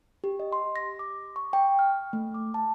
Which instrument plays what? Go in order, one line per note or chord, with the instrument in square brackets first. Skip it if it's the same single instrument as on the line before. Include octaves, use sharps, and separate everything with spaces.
[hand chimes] G4
D#5
C6
A#6
D6
C#6
G5
F6
A3
D6
A5